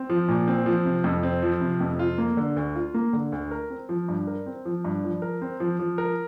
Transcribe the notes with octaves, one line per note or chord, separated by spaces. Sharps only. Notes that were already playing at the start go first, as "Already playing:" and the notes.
Already playing: C4
F3
A#2
C4
F3
C3
F2
C4
F3
C3
F2
F4
A#3
D3
D2
F4
A#3
D3
D2
A#4
C4
F3
G2
A#4
C4
F3
G2
F3
A#4
C4
F3
F3
A#4